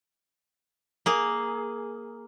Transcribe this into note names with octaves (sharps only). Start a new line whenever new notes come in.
A#3 G#4